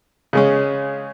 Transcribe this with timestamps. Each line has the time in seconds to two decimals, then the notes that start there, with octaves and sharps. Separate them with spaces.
0.33 C#3 G#3 C#4